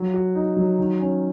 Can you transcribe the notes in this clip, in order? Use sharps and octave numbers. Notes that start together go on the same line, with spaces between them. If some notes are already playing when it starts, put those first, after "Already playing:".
Already playing: F#3
F#4
D#4
F#3
D#3
C#4